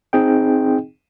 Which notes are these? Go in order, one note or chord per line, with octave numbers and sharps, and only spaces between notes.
C4 D#4 G#4 D#5 G5